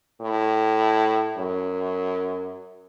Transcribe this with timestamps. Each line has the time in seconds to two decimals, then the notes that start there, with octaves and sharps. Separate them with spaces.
0.21 A2
1.38 F#2